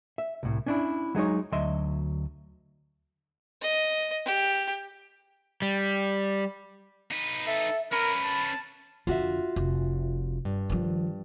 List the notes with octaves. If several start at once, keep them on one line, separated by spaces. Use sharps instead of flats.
E5
C2 A2
C#4 D4 E4
F#3 G#3 D#4 C#5
D2 F#3 D#5 E5 C6
D#5
G4
G3
D#4 B4
A4 E5
C#4 A#4 B4 B5
A5
F2 D3 F4 F#4 E5
F1
G2
D#3 F3